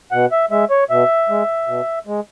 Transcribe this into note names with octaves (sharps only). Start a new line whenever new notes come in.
B2 F#5
E5
G#3 E5
C#5
B2 E5
G#3
B2
G#3